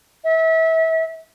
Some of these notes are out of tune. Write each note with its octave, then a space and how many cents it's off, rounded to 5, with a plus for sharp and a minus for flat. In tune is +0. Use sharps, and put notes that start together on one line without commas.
E5 -30